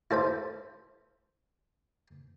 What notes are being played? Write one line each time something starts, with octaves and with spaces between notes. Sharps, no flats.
E4 A4 C5 B5